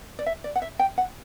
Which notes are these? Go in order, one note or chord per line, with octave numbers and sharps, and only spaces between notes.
D5
E5
D5
F#5
E5
G5
F#5